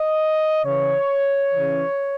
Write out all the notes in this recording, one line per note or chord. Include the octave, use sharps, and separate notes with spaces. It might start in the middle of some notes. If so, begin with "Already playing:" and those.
Already playing: D#5
C#3 E3 C#5
C#3 E3